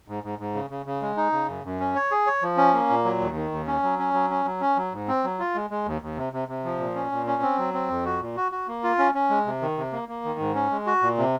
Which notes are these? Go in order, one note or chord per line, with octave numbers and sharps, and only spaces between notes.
G#2
G#2
G#2
C#3
C#3
C#3
G#3
D#4
C#3
F#2
F#2
C#4
C#5
G#4
C#5
F3
C#4
A#3
A#2
F#3
D#2
D#3
D#2
C#4
F#3
C#4
F#3
C#4
F#3
C#4
F#3
G#2
C4
F#3
F4
G#3
G#3
D#2
D#2
C3
C3
C3
F3
A#2
C#4
A#2
C#4
C4
F#3
C4
F2
F#4
A#2
F#4
F#4
A#3
F4
C#4
C#4
G#3
C3
D#3
C3
A#3
A#3
D#3
G#2
C#4
G#3
F#4
A#2
C3